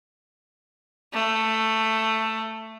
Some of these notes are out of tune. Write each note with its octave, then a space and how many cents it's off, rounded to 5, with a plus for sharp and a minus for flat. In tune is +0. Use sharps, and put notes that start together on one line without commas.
A3 +10